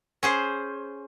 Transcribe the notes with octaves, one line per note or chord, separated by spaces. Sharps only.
C#4 G#4 C5